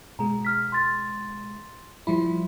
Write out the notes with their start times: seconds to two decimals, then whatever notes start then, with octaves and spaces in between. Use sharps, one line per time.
0.19 B2 G#3 A#5
0.45 F6 B6
0.72 C6 A6
2.07 F3 G3 E4 B5